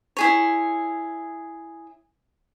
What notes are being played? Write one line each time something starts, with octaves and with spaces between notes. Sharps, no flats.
E4 G#4 C#5